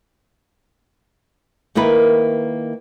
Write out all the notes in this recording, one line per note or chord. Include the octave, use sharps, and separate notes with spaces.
D#3 A#3 E4 A#4 B4